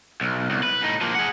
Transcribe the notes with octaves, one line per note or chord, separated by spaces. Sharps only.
B1
C2
B4
A2 D#4
F3 A#3
G#4 F#5